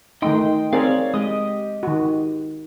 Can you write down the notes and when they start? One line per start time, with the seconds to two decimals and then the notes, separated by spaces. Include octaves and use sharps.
0.22 D#3 A3 D#4 D#5 G5 C6
0.73 C4 G#4 A#4 C#5 D5 F5
1.14 G#3 G4 D#5 D#6
1.83 D#3 F#4